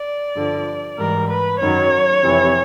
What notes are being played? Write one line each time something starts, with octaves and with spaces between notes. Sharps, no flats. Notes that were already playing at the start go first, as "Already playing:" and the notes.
Already playing: D5
G2 D3 F3
G#2 E3 G3 A#4
B4
F#2 D#3 F#3 C#5
F2 C3 E3